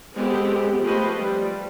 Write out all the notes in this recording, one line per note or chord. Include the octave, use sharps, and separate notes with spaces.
G#3 B3 C4 G4 A4
F3 A3 G4 B4 C5 D#5
G3